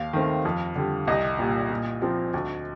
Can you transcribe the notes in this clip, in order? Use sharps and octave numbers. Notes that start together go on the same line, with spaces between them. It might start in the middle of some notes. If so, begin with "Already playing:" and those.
Already playing: D#2 F5
D#3 A3 C4
F2
D3 G3
C2 D#5
A#2 G3
A#2
F3 C4
D2